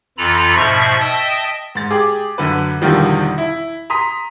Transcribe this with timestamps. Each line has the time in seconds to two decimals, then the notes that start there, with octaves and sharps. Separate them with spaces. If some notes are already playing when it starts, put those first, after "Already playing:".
0.18 F2 E3 F4 A4 A#5 B5
0.55 G#2 B2 F3 E5 B5 C#6
1.00 D#5 E5 G5 A5 D#6 E6
1.75 G#2 A6
1.90 G4 G#4 D6
2.38 F#2 D3 B4
2.81 E2 B2 D3 D#3 F3 G3
3.38 E4
3.90 A#5 C6 D#6 B6